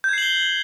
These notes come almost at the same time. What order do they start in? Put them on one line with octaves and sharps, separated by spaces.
G6 G#6 C7 F#7 G7